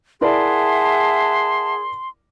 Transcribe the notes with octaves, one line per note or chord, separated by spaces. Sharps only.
E4 G#4 A#4 D5 E5 F#5 A5 C6